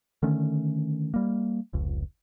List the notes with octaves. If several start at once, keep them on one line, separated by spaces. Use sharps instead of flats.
D3 D#3 A3 C#4
G3 A#3
F1 C#2